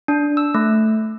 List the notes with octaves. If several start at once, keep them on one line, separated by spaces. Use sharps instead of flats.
D4
E6
A3